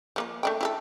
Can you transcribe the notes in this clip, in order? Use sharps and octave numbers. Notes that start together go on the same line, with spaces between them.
F3 A#3 F4
A3 D4 G5
E4 G4 A4